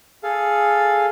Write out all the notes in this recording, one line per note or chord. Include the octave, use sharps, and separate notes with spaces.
G#4 A4 F5